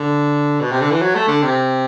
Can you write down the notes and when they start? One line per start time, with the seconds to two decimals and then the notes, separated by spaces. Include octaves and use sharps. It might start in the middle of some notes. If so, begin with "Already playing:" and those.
Already playing: D3
0.61 B2
0.71 C3
0.81 D3
0.91 E3
1.02 F#3
1.15 A3
1.28 D3
1.43 C3